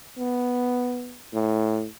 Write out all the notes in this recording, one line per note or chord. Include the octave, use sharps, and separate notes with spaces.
B3
A2